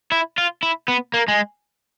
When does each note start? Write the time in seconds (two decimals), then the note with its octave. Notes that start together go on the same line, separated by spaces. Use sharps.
0.12 E4
0.38 F4
0.63 E4
0.88 B3
1.14 A#3
1.28 G#3